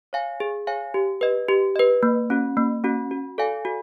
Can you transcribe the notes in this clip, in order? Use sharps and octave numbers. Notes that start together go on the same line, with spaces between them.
C#5 F5 G#5
G#4
C#5 F5 G#5
G4
B4 D#5
G4
B4 D#5
A#3
C#4 F#4
A#3
C#4 F#4
F#4
A4 D5 F5 G#5
F#4